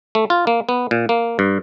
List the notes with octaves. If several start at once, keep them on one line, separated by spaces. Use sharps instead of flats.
A3
F4
A#3
B3
A#2
A#3
G2